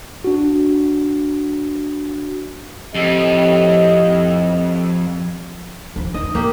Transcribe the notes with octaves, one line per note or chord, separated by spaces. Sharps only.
D4 F#4
F2 A2 G4 D#5
D#2 F3
D#4 D#5
E3 A#3 G4